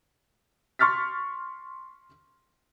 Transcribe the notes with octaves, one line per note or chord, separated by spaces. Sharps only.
C6 C#6 F6 A6 B6